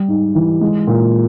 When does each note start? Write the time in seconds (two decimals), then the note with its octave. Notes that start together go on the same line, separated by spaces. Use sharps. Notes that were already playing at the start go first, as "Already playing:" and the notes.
Already playing: G3
0.08 G#2
0.35 E3
0.61 G#3
0.87 A#2